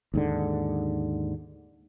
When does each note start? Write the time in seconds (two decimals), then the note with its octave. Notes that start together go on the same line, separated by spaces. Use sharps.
0.14 D#2 G#2 D3